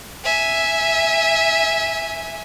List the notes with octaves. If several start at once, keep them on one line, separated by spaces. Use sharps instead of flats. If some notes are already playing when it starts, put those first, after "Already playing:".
E5 G#5